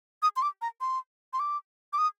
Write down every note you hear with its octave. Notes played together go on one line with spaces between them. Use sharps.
D#6
C6
D6
A#5
C6
C6
D6
D6
D#6